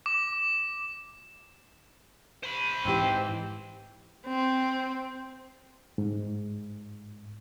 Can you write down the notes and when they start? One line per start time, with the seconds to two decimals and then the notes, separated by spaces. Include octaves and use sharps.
0.06 D6
2.43 C5 B5
2.85 G#2 E3 C4 G4
4.27 C4
5.98 G#2